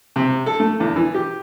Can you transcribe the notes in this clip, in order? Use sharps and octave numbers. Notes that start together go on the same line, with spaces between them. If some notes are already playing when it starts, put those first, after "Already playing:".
C3
A4
A3
E2
E3
G4